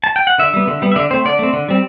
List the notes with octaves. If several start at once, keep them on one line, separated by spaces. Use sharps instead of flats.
A5
G5
F#5
D3 E5
G3 B3
D3
G3 B3
E5
D3 D5
A3 C4 C5
D3 D5
A3 C4
D3
G3 C4